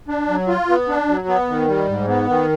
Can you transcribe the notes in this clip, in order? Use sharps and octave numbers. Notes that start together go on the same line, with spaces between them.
D4
F#3
F4
B3
D4
F#3
B3
D#3
G3
G#2
B3
D#3